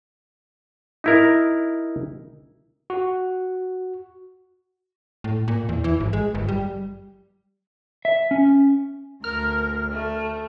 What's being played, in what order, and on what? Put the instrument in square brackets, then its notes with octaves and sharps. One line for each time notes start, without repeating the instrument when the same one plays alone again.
[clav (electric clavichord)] D#4 E4 A#4
[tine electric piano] F#4
[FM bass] A2
A#2
E2
E3
G#1
G#3
G1
G3
[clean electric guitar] E5
C#4
[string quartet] D2 [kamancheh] A#4 [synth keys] F6
[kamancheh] A3